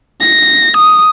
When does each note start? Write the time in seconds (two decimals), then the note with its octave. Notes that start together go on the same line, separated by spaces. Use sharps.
0.21 A#6
0.77 D#6